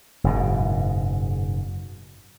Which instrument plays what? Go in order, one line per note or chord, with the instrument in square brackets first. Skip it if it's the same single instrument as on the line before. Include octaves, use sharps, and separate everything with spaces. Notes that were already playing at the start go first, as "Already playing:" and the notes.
[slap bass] F#1 G#2 B2